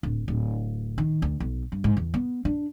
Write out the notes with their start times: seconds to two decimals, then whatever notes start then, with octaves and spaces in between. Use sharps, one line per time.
0.03 D1
0.28 D1
0.98 D#3
1.22 D2
1.40 B1
1.72 G2
1.84 G#2
1.97 E2
2.14 B3
2.45 D4